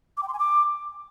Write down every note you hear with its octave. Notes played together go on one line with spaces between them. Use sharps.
D6
G5
C6
G#5
D6